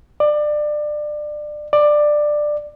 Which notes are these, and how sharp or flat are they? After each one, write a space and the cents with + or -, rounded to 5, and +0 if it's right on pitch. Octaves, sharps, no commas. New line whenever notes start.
D5 +25
D5 +15